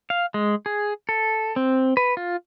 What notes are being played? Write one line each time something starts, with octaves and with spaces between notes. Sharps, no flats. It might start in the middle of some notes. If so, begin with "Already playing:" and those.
F5
G#3
G#4
A4
C4
B4
F4